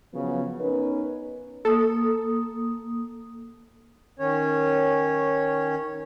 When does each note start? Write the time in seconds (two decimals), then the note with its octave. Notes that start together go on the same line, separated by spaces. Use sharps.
0.13 C#3 F3 F#3 B3
0.59 B3 C#4 D#4 A#4 B4
1.65 A#3 A4 D#6
4.19 D#3 C#4 C#5